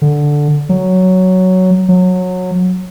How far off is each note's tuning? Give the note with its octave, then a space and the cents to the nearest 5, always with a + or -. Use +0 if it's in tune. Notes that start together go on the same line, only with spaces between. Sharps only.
D3 +0
F#3 +5
F#3 -20